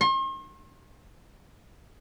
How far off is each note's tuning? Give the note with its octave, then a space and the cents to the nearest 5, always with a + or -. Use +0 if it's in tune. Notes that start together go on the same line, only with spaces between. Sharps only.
C6 +45